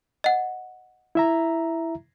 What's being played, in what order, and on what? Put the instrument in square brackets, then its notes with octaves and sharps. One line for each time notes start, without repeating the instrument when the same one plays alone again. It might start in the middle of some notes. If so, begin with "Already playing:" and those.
[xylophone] D#5 F#5
[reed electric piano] E4 E5 A#5